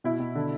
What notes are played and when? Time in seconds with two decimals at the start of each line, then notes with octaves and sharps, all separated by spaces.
0.04 B2 E4
0.20 B2
0.35 D3